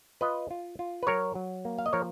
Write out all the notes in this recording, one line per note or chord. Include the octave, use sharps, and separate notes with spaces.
F4 B4 D#5
F4
F4
B4
F#3 A#4 C#5
F#3
A#3
F5
D#5
F3 A#4 C#5